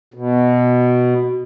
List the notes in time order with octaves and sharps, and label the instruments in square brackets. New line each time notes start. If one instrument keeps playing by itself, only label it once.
[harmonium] B2